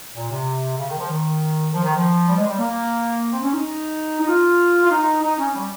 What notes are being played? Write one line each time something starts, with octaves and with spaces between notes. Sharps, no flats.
A#2
C3
C#3
D#3
F3
D#3
F3
D#3
F3
G3
G#3
G3
A#3
C4
C#4
D#4
D#4
F4
F4
D#4
D#4
C#4
G3